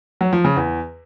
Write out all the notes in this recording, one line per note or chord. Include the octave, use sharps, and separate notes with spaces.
F#3
F3
C#3
E2